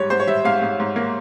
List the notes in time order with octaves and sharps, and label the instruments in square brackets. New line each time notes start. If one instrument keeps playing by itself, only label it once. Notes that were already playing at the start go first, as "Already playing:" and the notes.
Already playing: [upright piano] G#2 G3 C#5
G#2 C5
C#5
G3 E5
G#2 F5
G#2
G#2
A#3